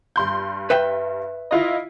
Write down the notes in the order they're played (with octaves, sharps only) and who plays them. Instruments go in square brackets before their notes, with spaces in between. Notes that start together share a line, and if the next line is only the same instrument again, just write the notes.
[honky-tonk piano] G2 C6 G6
[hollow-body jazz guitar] B4 E5 G5
[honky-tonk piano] E4 F4 D#5